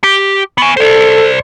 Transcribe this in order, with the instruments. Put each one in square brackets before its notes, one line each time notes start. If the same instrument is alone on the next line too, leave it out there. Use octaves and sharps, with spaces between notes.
[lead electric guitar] G4
[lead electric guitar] B3 G#5 [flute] C#6
[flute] A4 [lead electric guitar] C5 D5